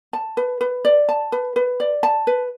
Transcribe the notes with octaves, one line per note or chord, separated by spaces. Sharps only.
A5
B4
B4
D5
A5
B4
B4
D5
A5
B4